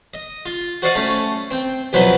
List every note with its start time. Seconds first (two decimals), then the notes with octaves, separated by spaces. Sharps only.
0.14 D#5
0.46 F4
0.82 F#4 C5 D5 D#5 F5 F#5
0.95 A3 C#4
1.51 C4 G5
1.93 C2 F2 B2 F#3 B4 C5